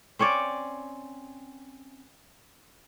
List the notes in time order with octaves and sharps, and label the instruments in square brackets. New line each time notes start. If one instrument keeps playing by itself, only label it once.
[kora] C4 C#4 C#5 D5